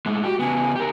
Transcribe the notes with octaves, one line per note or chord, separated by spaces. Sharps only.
A2 G#3
F#4 G4
C#3 B3 G#5
G4 A#4